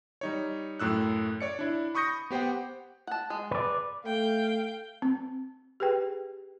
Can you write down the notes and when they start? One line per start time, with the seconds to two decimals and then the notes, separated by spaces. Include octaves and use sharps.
0.21 G3 D#4 C#5
0.79 F#2 A2 E6 F#6
1.41 C#5 D5 C#7
1.59 D4 E4
1.95 B5 C#6 D#6 G6 A#6 C#7
2.30 B3 G4 C5 F#5 G5
3.07 F#5 A5
3.30 G#3
3.51 B4 D5
4.05 A3 F5 G5
5.02 C4
5.80 G4 G#4 B4 G5